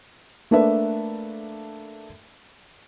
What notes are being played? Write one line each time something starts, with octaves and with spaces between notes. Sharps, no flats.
A3 A#3 D4 A4 B4 E5